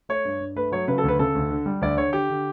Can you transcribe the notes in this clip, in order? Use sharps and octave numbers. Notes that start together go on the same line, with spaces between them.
A3 C#5
G2
G2
A3 B4
F#3 C#5
C#3 B4
A4
D2 B4
C#3 A4
D2
D3
G3
D2 D5
D3 C#5
D3 G4
D3